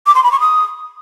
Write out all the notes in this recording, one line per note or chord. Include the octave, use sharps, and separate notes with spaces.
D6
C6
B5
C#6
D#6